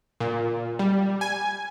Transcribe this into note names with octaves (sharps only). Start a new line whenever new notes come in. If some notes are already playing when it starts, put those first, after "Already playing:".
A#2
G3
G#5